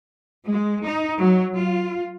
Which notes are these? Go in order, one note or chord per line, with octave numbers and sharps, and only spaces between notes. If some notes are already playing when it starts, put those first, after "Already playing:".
G#3
D#4
F#3
F4